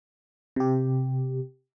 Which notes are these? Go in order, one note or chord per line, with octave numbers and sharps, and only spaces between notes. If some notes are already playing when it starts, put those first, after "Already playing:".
C3 G4